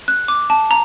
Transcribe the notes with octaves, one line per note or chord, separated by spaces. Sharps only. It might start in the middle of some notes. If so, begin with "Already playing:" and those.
F#6
D6
A5
A#5